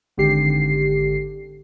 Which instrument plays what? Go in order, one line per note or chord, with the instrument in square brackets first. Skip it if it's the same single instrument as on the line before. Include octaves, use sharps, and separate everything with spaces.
[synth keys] G#1 D3 G4 C7